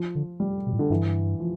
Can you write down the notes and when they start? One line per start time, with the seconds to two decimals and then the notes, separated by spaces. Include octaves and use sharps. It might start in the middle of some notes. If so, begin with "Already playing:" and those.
Already playing: F3
0.15 D3
0.40 G3
0.67 B2
0.73 A2
0.79 D3
0.90 G2 E3
1.40 F3